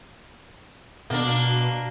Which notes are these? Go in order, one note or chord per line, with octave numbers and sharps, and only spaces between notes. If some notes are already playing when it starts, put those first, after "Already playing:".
B2 A#3 D4